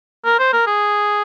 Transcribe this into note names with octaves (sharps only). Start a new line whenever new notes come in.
A#4
C5
A#4
G#4